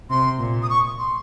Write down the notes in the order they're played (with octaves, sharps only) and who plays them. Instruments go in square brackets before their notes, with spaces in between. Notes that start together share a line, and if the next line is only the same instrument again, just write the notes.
[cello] C3 [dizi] C6
[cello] A#2
[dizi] D#6
C#6
C6